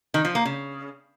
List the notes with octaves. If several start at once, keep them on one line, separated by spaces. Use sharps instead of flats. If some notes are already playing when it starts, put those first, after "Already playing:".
D#3
F3
A#3
C#3